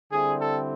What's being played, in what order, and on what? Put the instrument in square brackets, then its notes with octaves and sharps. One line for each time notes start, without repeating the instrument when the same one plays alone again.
[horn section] D3 G3 C4 E4 G#4
A4